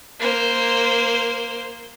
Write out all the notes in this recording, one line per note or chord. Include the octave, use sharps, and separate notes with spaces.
A#3 C5